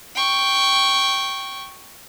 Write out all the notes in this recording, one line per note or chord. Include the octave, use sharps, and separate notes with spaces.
G5 C#6